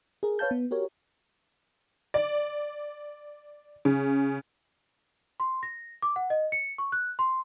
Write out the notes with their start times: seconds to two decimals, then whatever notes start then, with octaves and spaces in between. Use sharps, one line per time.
0.23 G#4 A#4
0.39 B4 C#5 F5 A5 G6
0.51 B3
0.71 F#4 G4 A#4 C#5
2.14 D5
3.85 C#3
5.40 C6
5.63 A#6
6.02 D6
6.16 F#5
6.30 D#5
6.52 C#7
6.78 C#6
6.92 F#6
7.19 C6